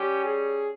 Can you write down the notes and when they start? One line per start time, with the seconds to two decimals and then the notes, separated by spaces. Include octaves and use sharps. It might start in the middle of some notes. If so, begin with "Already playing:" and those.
Already playing: G3 C#4 G4
0.24 G#4